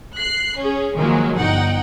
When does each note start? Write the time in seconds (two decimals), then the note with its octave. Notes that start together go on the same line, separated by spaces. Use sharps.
0.17 F#6 C7
0.60 C#4 G#4
0.95 D#3 F3 F#3 G#3 A#3
1.36 G1 D#4 F#5 G5